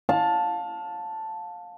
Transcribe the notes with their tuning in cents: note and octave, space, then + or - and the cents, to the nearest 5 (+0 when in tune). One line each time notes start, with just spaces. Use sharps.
F5 +25 A5 +0